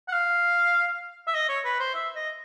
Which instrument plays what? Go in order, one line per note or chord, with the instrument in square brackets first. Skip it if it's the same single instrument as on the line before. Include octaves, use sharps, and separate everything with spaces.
[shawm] F#5
F5
E5
D#5
C#5
B4
C5
E5
D#5